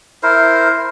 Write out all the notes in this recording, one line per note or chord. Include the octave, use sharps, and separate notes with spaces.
E4 A#4 C5